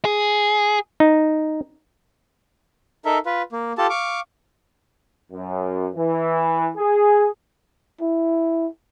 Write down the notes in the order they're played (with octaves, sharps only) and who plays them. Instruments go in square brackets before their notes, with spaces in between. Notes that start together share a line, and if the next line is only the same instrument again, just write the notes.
[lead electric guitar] G#4
[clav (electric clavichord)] D#4
[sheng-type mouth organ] D#4 A4 A#4 E5
F4 B4
A#3
F4 G4 A4 A5
F5 C#6 D6
[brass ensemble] F#2
E3
G#4
[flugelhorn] E4